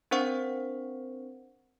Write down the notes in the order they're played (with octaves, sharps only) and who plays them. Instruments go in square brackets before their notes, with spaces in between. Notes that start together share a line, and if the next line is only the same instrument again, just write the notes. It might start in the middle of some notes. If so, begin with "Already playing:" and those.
[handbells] C4 D4 A#4 C5 F#5 C#6